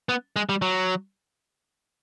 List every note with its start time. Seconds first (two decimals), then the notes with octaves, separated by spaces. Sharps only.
0.09 B3
0.36 G#3
0.49 G3
0.62 F#3